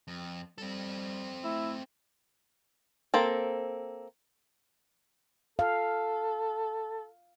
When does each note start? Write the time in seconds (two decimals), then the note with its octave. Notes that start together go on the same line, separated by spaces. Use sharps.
0.08 F2
0.58 G3 C4 A4
1.44 A3 E4
3.14 A#3 C4 A4
5.59 A4 F5